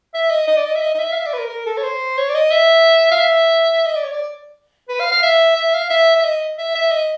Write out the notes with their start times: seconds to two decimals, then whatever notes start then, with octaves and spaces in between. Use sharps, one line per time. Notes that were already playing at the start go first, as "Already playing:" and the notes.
0.14 E5
0.31 D#5
0.48 D#5
0.56 D5
0.65 D#5
0.76 E5
0.81 D#5
0.94 D#5
0.99 E5
1.12 F5
1.16 E5
1.27 D5
1.34 B4
1.38 A#4
1.50 A#4
1.66 A4
1.78 C#5
1.83 C5
2.18 C#5
2.30 D5
2.35 D#5
2.52 E5
3.12 F5
3.20 E5
3.86 D#5
3.96 D5
4.04 C#5
4.12 D5
4.89 B4
5.00 F5
5.12 F5
5.23 E5
5.56 E5
5.74 F5
5.90 E5
6.16 E5
6.25 D#5
6.58 E5
6.75 E5
6.92 D#5